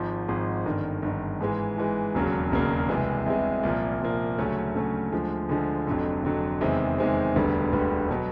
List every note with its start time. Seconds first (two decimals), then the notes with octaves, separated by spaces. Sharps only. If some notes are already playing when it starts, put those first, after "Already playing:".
Already playing: G#1 G#2 F3
0.28 G#1 G#2 F3
0.65 G1 G2 D#3
1.02 G1 G2 D#3
1.41 G#2 E3 G#3
1.78 G#2 E3 G#3
2.15 E1 D#2 C#3 F#3 A#3
2.52 E1 D#2 C#3 F#3 A#3
2.89 C2 C3 E3 G#3
3.26 C2 C3 E3 G#3
3.63 C2 A#2 F3 A#3
4.01 C2 A#2 F3 A#3
4.38 D2 C#3 F#3 A3 C#4
4.74 D2 C#3 F#3 A3 C#4
5.12 D2 D3 F3 G#3
5.49 D2 D3 F3 G#3
5.87 F1 F2 D3 F#3
6.24 F1 F2 D3 F#3
6.61 E2 C3 D#3 G#3 C4
6.98 E2 C3 D#3 G#3 C4
7.36 E1 D2 D3 G3 B3
7.72 E1 D2 D3 G3 B3
8.11 B2 F#3 B3